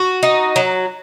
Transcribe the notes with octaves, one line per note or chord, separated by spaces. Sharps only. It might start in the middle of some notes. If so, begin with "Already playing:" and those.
Already playing: F#4
D#4
F#3